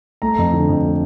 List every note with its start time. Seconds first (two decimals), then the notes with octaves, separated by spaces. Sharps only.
0.22 A3 A#5
0.38 F2
0.53 D3
0.69 F2
0.84 A3